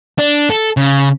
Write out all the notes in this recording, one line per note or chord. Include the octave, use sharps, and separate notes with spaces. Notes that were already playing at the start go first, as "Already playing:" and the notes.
D4
A4
C#3